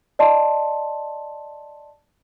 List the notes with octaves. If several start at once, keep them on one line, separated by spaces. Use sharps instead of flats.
D5 D#5 A5 C6